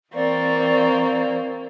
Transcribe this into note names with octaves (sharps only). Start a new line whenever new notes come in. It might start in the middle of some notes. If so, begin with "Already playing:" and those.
E3 A#3 C4 D5 C#6